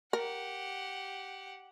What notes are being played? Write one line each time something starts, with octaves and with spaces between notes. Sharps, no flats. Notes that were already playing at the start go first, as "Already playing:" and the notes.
G4 A#4 F#5